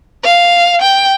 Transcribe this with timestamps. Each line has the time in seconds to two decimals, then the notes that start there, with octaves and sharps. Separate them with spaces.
0.24 F5
0.81 G5